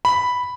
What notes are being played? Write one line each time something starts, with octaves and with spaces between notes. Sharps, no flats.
B5